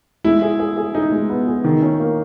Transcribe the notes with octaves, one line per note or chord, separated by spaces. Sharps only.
G#3 E4
G#4
G#4
G#4
D#4 G#4
G#3
B3
G#4
D#3
C#4
A#3